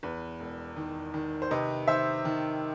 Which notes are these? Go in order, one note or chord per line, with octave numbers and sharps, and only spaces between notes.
E2 B4
E1
D#3
D#3
C5
C3 B4 D#5
D#3 C5 E5
D#3